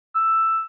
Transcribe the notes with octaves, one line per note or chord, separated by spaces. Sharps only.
E6